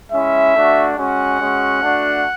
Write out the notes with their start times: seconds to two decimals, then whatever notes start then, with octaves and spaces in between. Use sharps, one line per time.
0.11 G#3 C#4 E4 E5
0.54 A3 D4 F#4
0.97 G#3 C#4 F#4 F#5
1.39 G#3 C#4 F#4
1.82 A3 D4 F#4